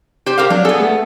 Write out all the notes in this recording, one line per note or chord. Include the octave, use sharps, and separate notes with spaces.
G4 C5
G4 A#4 F5
F#3 D4
B3 G#4 A4
A3